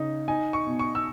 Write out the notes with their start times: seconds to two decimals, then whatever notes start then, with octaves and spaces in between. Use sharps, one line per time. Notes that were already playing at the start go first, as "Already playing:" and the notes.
Already playing: C#3 D#4
0.28 D#4 G#5
0.53 C#6
0.66 B2
0.79 C#6
0.95 E6